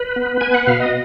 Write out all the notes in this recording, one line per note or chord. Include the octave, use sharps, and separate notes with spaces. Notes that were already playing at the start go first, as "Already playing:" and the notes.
Already playing: B4
B3
B3 G#5
F#5
B2 F5
D#5